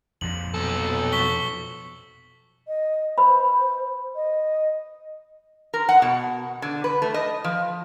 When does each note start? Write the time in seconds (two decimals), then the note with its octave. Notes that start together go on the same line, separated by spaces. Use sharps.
0.21 F2 A#2 F3 F#7
0.54 B1 A4 A5
1.13 C#6 B6 G7
2.68 D#5
3.18 B4 C5 B5
4.15 D#5
5.74 A#4
5.89 F#5
6.02 B2
6.62 D3
6.84 B4
7.02 A3
7.14 D#5
7.44 F3